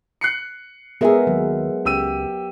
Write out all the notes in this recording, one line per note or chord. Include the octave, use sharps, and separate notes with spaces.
F#6 C7 C#7
G#3 B3 G#4 A#4 E5
D#2 F#3
C#2 G4 E6 D#7